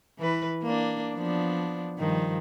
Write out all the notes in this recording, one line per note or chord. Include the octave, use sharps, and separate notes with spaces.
E3 B4
A#3 D4
F3 B3 D4
G2 D#3 F3